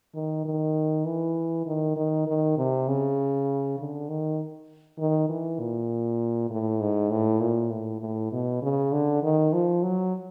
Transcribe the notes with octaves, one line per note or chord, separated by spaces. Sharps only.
D#3
D#3
E3
D#3
D#3
D#3
C3
C#3
D3
D#3
D#3
E3
A#2
A2
G#2
A2
A#2
A2
A2
B2
C#3
D3
D#3
F3
F#3